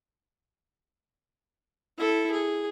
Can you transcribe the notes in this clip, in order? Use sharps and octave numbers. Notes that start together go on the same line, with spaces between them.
E4 A4
G#4